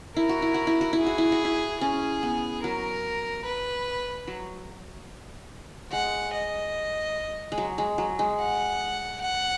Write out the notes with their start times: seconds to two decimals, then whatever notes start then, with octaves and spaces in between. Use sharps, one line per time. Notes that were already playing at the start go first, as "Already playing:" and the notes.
0.16 E4 A#4
0.29 F#4
0.42 E4
0.54 F#4
0.67 E4
0.81 F#4
0.93 E4
0.99 G#4
1.07 F#4
1.18 E4
1.32 F#4
1.45 E4
1.81 C#4 G#4
2.23 B3
2.63 F#3 A#4
3.46 B4
4.27 F#3
5.92 G#3 F#5
6.34 D#5
7.52 G#3
7.58 F#3
7.78 G#3
7.98 F#3
8.19 G#3
8.39 F#5
9.22 F#5